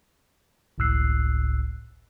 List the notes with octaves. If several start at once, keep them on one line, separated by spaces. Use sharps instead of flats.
G1 C#2 A2 E6 F#6 C7